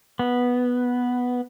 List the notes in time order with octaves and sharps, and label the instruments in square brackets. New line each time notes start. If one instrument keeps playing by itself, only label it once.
[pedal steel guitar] B3